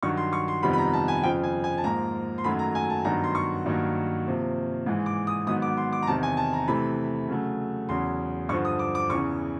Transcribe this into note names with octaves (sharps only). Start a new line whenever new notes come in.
G2 D#3 F#3 C#6
C6
C#6
C6
F2 C3 D#3 G3 B3 B5
B5
A#5
A5
G#5
F2 C#3 F3 G5
G#5
G#5
A5
G#2 F3 A#3 A#5
C6
F#2 D#3 F#3 A3 B5
A#5
G#5
A5
G2 D#3 F#3 B3 A#5
C6
C#6
G2 D#3 F#3 A#3
C3 F3 A#3
G#2 E3 G#3
D6
D#6
G#2 D#3 F#3 B3 D#6
D6
C6
D6
A#5
E2 C3 D#3 A5
G#5
A5
A#5
C3 E3 A3 B5
C#3 F#3 A3
E2 C#3 F#3 C6
G2 D3 F3 C#6
D#6
D6
D6
E2 C#3 E3 C#6